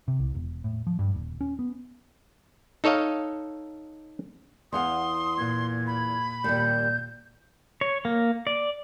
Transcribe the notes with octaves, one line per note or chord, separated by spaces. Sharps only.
C3
C2
E1
A2
F3
G2
D#1
C#4
B3
D#4 A4 C#5 D#5 F5
E2 F5 F#5 C6 D#6
A#2 G#6
B5
D#2 A#2 G3 G6
C#5
A#3
D5